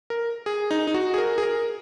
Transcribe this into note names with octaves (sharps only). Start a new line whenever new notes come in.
A#4
G#4
D#4
D#4
F#4
G#4
A#4
G#4
A#4